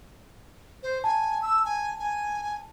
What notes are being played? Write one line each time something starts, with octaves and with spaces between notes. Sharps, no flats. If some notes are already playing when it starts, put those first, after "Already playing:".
C5
G#5 A5
E6
G#5
G#5